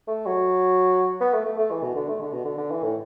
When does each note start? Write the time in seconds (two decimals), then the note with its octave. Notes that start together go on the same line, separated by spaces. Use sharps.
0.07 A3
0.26 F#3
1.21 B3
1.33 A3
1.45 A3
1.58 A3
1.71 E3
1.83 B2
1.95 D3
2.09 A3
2.21 D3
2.33 B2
2.45 D3
2.57 D3
2.71 E3
2.83 A2